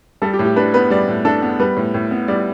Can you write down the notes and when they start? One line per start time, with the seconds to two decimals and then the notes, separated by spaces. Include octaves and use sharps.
0.22 G3 A4
0.33 G4
0.39 A2
0.45 G4
0.56 D4 B4
0.74 B3 B4
0.90 G3 D5
1.08 A2
1.25 D4 A4
1.42 B3
1.60 G3 B4
1.76 A2
1.94 A2
2.11 B3
2.28 G3 D5